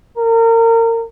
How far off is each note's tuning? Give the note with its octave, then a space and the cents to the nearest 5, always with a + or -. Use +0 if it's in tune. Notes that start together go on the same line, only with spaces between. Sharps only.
A#4 -30